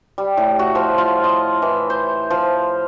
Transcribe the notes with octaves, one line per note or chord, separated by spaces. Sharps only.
G3
A2
F#4
F3
F4
D#5
E3
C5
F3